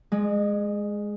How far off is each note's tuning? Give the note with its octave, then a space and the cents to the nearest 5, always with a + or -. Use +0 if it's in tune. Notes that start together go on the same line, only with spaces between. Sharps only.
G#3 +0 D#5 -35